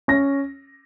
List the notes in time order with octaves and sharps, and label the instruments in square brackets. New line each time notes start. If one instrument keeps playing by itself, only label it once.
[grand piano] C#4 A#6